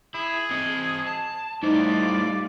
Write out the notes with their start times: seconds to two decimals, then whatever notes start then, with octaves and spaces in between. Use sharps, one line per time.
0.14 E4 G#4
0.51 C4 D#5
1.07 A5
1.63 A2 G3 A3 D#4 F4 C5 D5